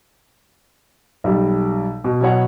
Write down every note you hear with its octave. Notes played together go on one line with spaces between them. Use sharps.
B1 G3
B2
B2 F#3 E4 C#5 F#5